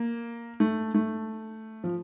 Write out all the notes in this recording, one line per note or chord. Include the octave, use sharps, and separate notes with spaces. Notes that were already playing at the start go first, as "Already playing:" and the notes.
Already playing: A#3
A3
A3
F3